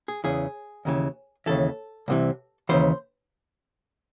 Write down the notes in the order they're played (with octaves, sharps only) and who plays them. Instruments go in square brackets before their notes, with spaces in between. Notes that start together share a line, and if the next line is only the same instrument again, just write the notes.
[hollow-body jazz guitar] G#4
E2 C#3 E3 G#4
D#2 C#3 E3
D#2 C#3 E3 A4
C2 C3 E3
D#2 C#3 E3 C5